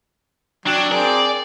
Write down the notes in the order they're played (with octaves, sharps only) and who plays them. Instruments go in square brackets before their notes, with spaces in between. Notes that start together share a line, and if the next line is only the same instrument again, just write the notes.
[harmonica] F#3 G5 [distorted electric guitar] D4
[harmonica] C4 G#4 A#4 [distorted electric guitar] D5